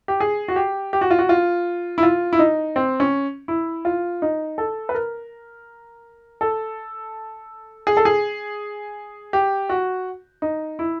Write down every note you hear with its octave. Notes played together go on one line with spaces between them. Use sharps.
G4
G#4
F#4
G4
G4
F#4
F4
F#4
F4
E4
F4
E4
D#4
C4
C#4
E4
F4
D#4
A4
B4
A#4
A4
G#4
A4
G#4
G4
F#4
D#4
E4